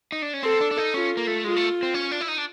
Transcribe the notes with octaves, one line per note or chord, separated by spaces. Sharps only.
D#4
D4
C#4
C4 A4
D4
D4
D#4
C#4 F4
A#3
A3
G#3 F4
A3
C4
C#4
D4
E4
D#4
D4